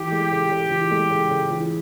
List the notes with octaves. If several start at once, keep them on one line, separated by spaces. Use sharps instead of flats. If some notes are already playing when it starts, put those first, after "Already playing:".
Already playing: E3 G4
G#3
C#3
C#3
E3
G#3
C#3
C#3
E3